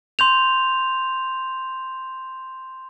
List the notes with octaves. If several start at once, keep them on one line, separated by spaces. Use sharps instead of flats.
C6 G6 F7